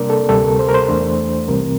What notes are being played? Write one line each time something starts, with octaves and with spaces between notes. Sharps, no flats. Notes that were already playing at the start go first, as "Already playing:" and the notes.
Already playing: C3 G3 A#3 D4 A#4 D5
A4
D2 C3 G3 A4
A#4
C5
A#4
C5
E2 E3 A3 D4
C2 C3 E3 G3 C4 A#4